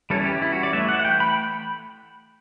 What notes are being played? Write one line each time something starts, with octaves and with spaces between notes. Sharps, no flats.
E3 G3 C#4 E4 A4
G4
E4
F#4
D5
E3 A3 E4 E5
F#5
F#5
G5
B5